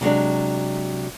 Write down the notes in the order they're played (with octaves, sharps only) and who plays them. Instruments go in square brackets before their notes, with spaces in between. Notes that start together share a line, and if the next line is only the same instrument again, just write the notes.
[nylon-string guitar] C3 F#3 G#3 D4